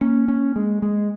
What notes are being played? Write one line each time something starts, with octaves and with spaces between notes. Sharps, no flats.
A#3 C#4
C#4
G#3
G#3